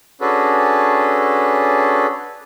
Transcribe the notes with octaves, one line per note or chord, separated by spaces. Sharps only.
C#4 D4 F#4 G#4 A4 B4